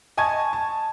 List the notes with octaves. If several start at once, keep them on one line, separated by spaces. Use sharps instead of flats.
D#5 G#5 A5 C#6 G#6
A5